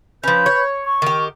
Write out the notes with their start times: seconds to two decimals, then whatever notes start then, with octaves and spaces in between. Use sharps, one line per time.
0.24 F3 C#4 B4 B5 G6
0.46 C#5
0.84 C#6
1.02 D#3 G4